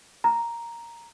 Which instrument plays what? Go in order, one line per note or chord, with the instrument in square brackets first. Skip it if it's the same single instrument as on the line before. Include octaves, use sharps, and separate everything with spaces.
[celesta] A#5